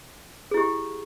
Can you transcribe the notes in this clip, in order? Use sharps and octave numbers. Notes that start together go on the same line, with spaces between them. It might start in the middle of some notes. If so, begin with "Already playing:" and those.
E4 G4 G#4